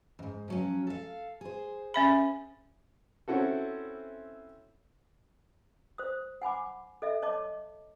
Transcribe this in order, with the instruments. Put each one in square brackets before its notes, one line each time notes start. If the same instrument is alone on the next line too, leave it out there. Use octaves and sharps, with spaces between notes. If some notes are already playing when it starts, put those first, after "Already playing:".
[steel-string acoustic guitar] F2 G#2
F3 F#3 C#4
A4 F5
G#4 C5
[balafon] C#4 E5 B5
[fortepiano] C4 C#4 E4 F#4 A4
[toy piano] C5 D#6
F#5 G#5 B5 D6
A4 D#5 E5
C#5 D#5 A5 D6